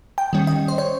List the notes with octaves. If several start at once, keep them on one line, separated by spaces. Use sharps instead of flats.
G5
D#3 G3 C#4
D#5
C5
C#5